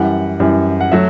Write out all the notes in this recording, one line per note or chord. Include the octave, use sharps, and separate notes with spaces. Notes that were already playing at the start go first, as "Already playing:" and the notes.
Already playing: F#2 E3 G3 F#5
F#2 E3 G3
F#5
F#3 A3 E5